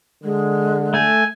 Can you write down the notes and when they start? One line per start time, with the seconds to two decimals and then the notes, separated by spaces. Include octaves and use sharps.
0.24 D3 G#3
0.94 A3 G#5